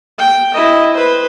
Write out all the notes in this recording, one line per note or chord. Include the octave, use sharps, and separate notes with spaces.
G5
E4 D#5
B4 C5